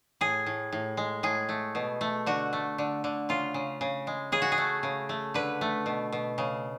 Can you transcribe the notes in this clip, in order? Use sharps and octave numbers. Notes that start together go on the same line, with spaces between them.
A2 G#4
A2
A2
G#3
A2 G#4
A3
B2
A3
D3 F#4
A3
D3
D3
C#3 F4
C#3
C#3
G#3
C#3 G#4
F#4
G#4
A3
C#3
A3
D3 B4
A3
B2
B2
C#3